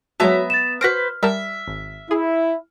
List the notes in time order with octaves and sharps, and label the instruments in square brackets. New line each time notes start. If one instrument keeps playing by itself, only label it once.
[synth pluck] F#3 G#3 A5 [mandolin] B3 E5 A#5 [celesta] F#4 C#5
[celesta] A6 E7
[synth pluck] F#4 A#6 D7 [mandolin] B4 C5 [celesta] F6
[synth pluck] G3 A#4 A5 [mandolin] E5
[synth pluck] G#1
[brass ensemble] E4 [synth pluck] G#4